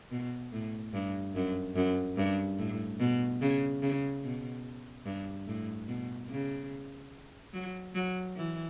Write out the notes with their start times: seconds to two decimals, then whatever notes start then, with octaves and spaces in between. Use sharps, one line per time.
0.11 B2
0.52 A2
0.94 G2
1.35 F#2
1.76 F#2
2.17 G2
2.59 A2
3.00 B2
3.42 C#3
3.82 C#3
4.24 B2
5.06 G2
5.47 A2
5.88 B2
6.30 C#3
7.54 F#3
7.95 F#3
8.36 E3